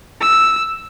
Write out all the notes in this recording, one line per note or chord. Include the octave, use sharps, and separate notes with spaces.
E6